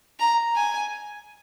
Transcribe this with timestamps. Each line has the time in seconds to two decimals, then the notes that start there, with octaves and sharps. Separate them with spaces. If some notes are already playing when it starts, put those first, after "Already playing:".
0.19 A#5
0.55 G#5